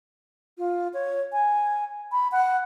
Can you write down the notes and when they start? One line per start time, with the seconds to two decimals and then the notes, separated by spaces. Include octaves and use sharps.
0.58 F4
0.93 C#5
1.32 G#5
2.12 B5
2.32 F#5